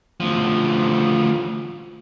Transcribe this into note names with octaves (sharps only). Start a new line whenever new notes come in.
D2 F3